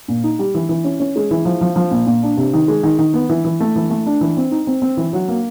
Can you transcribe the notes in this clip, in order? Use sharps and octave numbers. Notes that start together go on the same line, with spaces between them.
A#2
D#4
G3
E3
E3
C#4
C#4
G#3
E3
F3
F3
F3
A#2
A#2
D4
C3
D#3
G#3
D#3
D#3
B3
E3
E3
A3
E3
A3
D4
E3
C4
D#4
C4
C4
E3
F#3
A#3